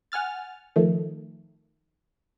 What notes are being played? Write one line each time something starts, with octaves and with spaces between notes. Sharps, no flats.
F#5 G#5 F6 A6
D#3 F3 A3